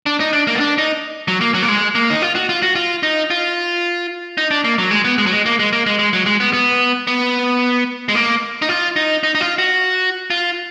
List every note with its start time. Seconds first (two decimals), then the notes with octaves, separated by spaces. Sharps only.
0.06 D4
0.20 D#4
0.33 D4
0.47 A#3
0.55 B3
0.60 D4
0.78 D#4
1.28 F#3
1.41 A#3
1.54 F#3
1.63 A#3
1.68 G#3
1.95 A#3
2.10 D#4
2.22 F4
2.36 F#4
2.49 F4
2.63 F#4
2.75 F4
3.03 D#4
3.30 F4
4.38 D#4
4.51 D4
4.64 A#3
4.78 F#3
4.91 G#3
5.05 B3
5.18 G#3
5.26 F#3
5.32 G#3
5.46 A#3
5.59 G#3
5.73 A#3
5.86 G#3
5.99 G#3
6.13 F#3
6.26 G#3
6.40 B3
6.53 B3
7.07 B3
8.09 G#3
8.15 A#3
8.62 D#4
8.69 F4
8.96 D#4
9.23 D#4
9.35 D#4
9.41 F4
9.58 F#4
10.30 F4